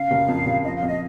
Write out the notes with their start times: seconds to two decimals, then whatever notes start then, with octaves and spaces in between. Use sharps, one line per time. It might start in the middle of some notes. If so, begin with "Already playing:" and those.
Already playing: C#3 F5
0.11 F#1
0.28 F2
0.46 F#1
0.64 F3 D#5
0.76 F5
0.83 F2
0.88 D#5